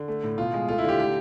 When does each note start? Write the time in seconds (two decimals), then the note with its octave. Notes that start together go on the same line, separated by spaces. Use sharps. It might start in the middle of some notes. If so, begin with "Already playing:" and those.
Already playing: D3
0.08 A3
0.23 A2
0.38 B2 F4
0.54 G#3
0.69 A3 F4
0.78 E4
0.84 D3 G4
1.00 A3 G4